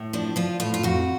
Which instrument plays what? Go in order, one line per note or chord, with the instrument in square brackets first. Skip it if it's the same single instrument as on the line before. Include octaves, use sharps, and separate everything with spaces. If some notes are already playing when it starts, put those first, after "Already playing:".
Already playing: [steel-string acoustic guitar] A2
F3 D4
F3 F4
A2 F4
F4
F2 F#4